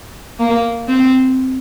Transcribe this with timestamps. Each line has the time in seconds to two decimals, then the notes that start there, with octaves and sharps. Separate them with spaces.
0.39 A#3
0.88 C4